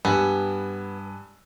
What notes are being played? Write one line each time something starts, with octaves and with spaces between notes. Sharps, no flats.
G2 B3 G#5 E6